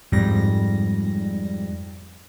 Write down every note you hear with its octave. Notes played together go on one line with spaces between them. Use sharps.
F2 G#2 G3 A#6